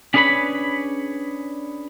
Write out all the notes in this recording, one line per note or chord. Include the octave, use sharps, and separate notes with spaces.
C#4 D4 G#4 B4 C#5 B5